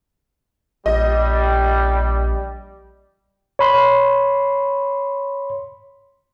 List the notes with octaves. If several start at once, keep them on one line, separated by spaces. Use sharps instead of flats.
A#1 G3 D#5
C#5 B5 C6